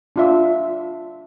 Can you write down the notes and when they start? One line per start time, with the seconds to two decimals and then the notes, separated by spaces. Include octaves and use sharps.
0.16 D4 F4 E5